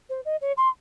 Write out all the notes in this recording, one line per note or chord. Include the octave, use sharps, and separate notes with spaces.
C5
D#5
C#5
C6